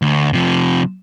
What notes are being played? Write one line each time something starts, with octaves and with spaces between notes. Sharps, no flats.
D2
C3 F3